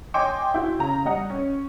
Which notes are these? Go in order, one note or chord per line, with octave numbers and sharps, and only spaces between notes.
C#5 D#5 G5 G#5 C6 D6
E4 F#4 G6
C#3 A#5
G3 D#5 F#5
C#4